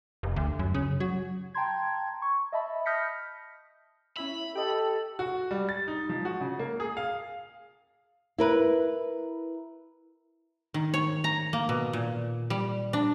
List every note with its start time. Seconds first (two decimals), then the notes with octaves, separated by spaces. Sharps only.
0.23 F1
0.36 D2
0.59 F#2
0.74 C#3
1.00 F#3
1.54 G5 A5 A#5 C6 G#6
2.22 C#6
2.52 D#5 E5 A5 B5
2.85 D#6 F6 G6 A#6 B6 C#7
4.17 C#4 E4 E5 B5
4.55 G4 A4 D#5 G5
5.19 F#4
5.51 G3
5.69 A6
5.88 D#4
6.09 F3
6.25 F#4
6.41 C#3
6.59 A#3
6.80 G#4
6.97 F5
8.38 E4 A#4 B4
10.74 D#3
10.94 C#5
11.24 A#5
11.53 A#3
11.69 B2
11.93 A#2
12.50 G3
12.93 D4